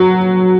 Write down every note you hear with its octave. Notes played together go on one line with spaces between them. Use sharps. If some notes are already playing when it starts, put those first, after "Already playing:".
Already playing: F#3